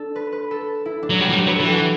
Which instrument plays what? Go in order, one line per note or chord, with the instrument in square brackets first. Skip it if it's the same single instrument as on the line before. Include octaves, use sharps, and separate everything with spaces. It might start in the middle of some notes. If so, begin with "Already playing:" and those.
Already playing: [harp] D4 A4
B4
B4
A4
E4
D4
[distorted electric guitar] F#3
[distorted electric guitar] G3 [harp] F#4
[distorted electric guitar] E3
F#3
[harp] G4
[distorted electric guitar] F#3 [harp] B4
[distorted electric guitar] E3 [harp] A4
[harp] F#4 G4